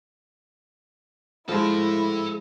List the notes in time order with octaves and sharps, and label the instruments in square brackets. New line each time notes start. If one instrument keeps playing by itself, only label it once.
[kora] F3 G#3 [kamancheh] E4 [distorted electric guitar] A4 B5